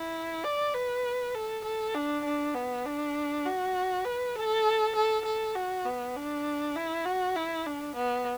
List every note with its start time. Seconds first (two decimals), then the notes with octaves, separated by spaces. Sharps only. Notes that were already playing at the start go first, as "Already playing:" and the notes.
Already playing: E4
0.44 D5
0.74 B4
1.35 A4
1.64 A4
1.95 D4
2.25 D4
2.55 B3
2.85 D4
3.45 F#4
4.05 B4
4.35 A4
4.96 A4
5.25 A4
5.55 F#4
5.85 B3
6.16 D4
6.76 E4
7.06 F#4
7.36 E4
7.66 D4
7.96 B3